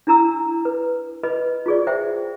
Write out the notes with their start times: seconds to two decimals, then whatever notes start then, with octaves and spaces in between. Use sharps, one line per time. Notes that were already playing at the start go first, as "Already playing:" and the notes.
0.07 D4 E4 A#5 E6
0.65 B4
1.23 B4 D#5 B5
1.66 F4 G#4 D5
1.87 C5 E5 G5